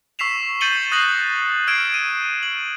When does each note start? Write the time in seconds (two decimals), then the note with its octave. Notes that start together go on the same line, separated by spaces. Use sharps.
0.19 C#6 E6 B6 C7 E7 F7
0.61 G6 A6 C#7 D#7 F#7 G7
0.92 D#6 F#6 A6 A#6 C7 F#7
1.67 E6 F6 G#6 C7 D7 E7
1.94 D#7
2.43 F#7